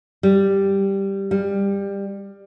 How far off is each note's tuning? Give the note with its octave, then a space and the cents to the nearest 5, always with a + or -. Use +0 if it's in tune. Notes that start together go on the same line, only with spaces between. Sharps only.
G3 +0
G3 +20